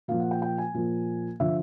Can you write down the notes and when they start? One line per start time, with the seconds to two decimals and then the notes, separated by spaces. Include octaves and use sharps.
0.08 A#2 F3 F5
0.20 F#5
0.31 G5
0.42 G5
0.58 G#5
0.74 A#2 F3
1.40 D3 F3 E5